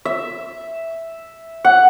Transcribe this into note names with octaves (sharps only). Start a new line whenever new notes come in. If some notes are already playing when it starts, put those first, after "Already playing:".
E5
F#5